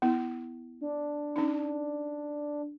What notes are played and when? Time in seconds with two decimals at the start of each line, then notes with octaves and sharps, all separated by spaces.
0.02 B3 E4
0.81 D4
1.36 C#4 D#4